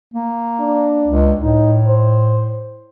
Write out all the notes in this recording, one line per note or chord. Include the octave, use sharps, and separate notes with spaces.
A#3
D4
C#2
A2 D#4
C5